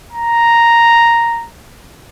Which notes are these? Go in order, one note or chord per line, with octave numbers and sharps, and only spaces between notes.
A#5